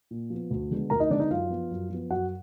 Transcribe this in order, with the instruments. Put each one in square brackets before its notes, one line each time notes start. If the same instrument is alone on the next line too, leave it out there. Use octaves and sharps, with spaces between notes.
[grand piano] A#2
F3 B3
D2
D3 G#3 B3
D2 A#4 A#5
D#4 D#5
D3 G#3 B3 D4 D5
D#4 D#5
F#2 F4 F5
F3 B3
F#2
F3 B3
F#2 F#4 F#5